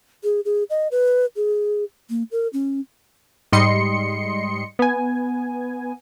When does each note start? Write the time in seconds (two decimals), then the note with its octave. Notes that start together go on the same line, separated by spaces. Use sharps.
0.24 G#4
0.45 G#4
0.70 D#5
0.91 B4
1.36 G#4
2.10 A#3
2.32 A#4
2.53 C#4
3.52 G#2 G3 D#5 C6 C#7
4.79 B3 G#5